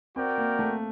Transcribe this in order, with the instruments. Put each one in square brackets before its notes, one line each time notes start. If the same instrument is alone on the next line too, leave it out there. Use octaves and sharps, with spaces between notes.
[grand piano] C4 [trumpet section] F#4 A#4 D5 G5
[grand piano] A#3
A3